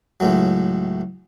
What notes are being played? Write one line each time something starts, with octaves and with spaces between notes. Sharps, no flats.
C#2 A2 F#3